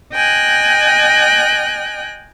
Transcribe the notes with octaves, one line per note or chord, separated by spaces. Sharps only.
D#5 G5 G#5 F#6